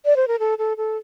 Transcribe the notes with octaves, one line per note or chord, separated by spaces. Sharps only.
D5
C5
A#4
A4
A4
A4